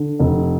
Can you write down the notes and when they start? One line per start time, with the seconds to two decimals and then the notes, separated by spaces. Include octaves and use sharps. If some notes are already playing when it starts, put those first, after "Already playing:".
Already playing: D3
0.19 F1